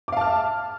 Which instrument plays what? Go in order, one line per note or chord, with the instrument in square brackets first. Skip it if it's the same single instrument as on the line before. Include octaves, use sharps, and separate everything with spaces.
[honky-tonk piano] D6
F5
A5
F6
E5